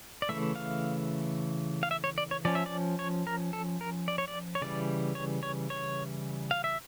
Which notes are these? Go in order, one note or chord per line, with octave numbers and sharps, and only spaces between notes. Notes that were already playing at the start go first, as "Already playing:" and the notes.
D5
C#3 E3 A3 E5
F5
F5
E5
C#5
D5
C#5
F3 C#4 D5
E5
D5
C#5
A#4
A4
A#4
D5
C#5
D5
C#5
C#3 E3 G3 D5
C#5
C#5
C#5
F5
E5